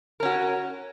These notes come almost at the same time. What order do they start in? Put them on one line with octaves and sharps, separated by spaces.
A#4 C#4 F#4